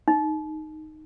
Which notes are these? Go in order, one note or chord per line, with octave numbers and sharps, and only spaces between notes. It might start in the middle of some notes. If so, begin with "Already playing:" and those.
D#4